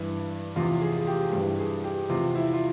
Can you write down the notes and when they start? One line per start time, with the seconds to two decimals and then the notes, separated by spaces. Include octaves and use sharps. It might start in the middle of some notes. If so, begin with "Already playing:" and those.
Already playing: G2 E3
0.56 E2 C3 F3 F4
0.81 G#4
0.98 G#4
1.07 G4
1.32 G2 E3 G4
1.59 G#4
1.84 G4
2.09 E2 C3 F3 F4
2.35 E4
2.53 F4